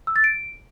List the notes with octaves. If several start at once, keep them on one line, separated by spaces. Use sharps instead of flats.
E6
A6
D7